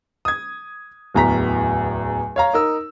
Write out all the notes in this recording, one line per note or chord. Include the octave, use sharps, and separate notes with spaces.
D#6 G#6
D1 E2 A#5 B6
C#5 F5 A#5
D#4 A#4 E6